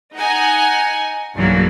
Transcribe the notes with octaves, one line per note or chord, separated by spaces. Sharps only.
D#4 D#5 F#5 G#5
B1 G2 C#3 E3 F#3 A#3